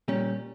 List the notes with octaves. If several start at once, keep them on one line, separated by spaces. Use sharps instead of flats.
A#2 G3 C#4